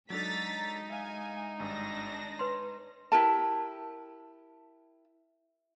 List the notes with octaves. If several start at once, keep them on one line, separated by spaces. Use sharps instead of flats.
F#3 G#3 D4 D#4 A4 A#5 A6 B6
E5 F5 G#5
G#1 G2 D4 A#6
B4 C#5 C6
E4 G4 A#4 A5